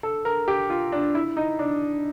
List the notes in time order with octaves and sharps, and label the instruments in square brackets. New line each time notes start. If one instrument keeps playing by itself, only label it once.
[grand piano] A4
A#4
G4
F4
D4
E4
D#4
D4